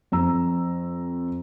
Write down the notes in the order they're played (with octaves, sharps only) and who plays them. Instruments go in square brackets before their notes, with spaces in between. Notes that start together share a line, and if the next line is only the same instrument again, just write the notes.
[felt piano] F2 A#5 E6